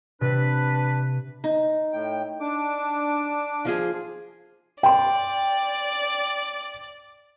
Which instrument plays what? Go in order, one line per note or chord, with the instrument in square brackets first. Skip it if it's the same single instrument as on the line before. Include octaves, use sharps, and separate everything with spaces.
[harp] C3 [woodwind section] D4 B4
[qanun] D#4
[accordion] A2 G5
D4 D6
[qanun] F3 F4 G#4
[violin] D5 [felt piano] G5 C6